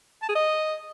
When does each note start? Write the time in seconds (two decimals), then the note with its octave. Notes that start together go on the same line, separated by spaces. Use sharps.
0.22 A5
0.29 G#4
0.36 D#5